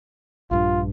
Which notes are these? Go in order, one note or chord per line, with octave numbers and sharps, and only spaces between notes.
A#1 G2 D4 F4